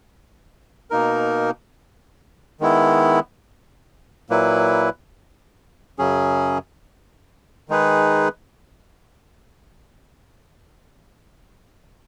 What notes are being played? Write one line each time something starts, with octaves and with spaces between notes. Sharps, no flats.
B2 A#3 D#4 A#4
D#3 G#3 B3 E4
A#2 F#3 A#3 E4 B4
F#2 C#3 F#3 C#4 G#4
D#3 G#3 D#4 G#4 B4